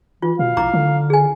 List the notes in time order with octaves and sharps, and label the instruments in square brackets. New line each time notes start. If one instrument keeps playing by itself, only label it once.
[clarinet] E3 [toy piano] F4
[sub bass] B2 [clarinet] F5
[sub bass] A#1 [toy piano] E4 A#5 D6
[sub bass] D3
[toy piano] G#4 G#5